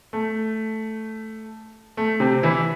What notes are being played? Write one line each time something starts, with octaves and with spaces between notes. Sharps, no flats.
A3
A3
C3 C4
E3 E4